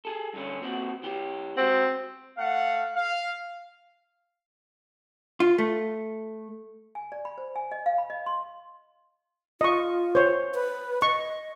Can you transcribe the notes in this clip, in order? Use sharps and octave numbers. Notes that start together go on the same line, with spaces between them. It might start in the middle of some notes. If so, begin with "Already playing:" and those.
G#4 A4
G2 D3 C#4
A#2 C4 F#4
E3 G4
G#3 C4 F#4 F#5
A3 F5 F#5
F5
F4
A3
G#5
D5
B5
C5
G#5
D#5
F5
B5
D#5
C6
F4 D#5 C#6
C5 C#5
B4
D#5 C#6